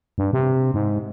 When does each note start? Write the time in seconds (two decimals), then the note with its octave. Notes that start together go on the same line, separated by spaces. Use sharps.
0.18 G2
0.33 C3
0.74 G#2